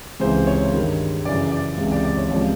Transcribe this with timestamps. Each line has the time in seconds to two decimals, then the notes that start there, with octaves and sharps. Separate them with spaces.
0.20 C#2 C3 E3 C5
0.47 C#5
0.73 G2 D#3
1.25 F#2 C#3 E3 D5
1.51 D5
1.78 C#2 C3 E3
1.92 D5
2.05 D5
2.17 C#5
2.30 C#2 C3 F3 D5